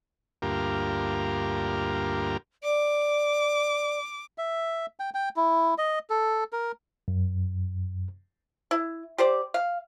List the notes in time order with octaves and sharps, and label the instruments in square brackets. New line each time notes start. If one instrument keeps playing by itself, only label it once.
[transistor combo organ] D2 G2 A#3 F4 G4 A#4
[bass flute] D5 [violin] D6
[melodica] E5
G5
G5
E4
D#5
A4
A#4
[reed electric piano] F#2
[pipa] E4
G4 C5 D5
F5